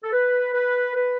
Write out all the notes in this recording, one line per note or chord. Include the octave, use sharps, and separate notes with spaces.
A4
B4
B4
B4